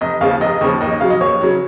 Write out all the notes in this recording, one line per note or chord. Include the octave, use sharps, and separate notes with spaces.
F1 D#5
D#2 C#3 F3 F5
F1 D#5
D#2 C#3 F3
D#2 D#5
D#5
C#3 F#3 F5
D#5
D#2 C#5
C#3 F#3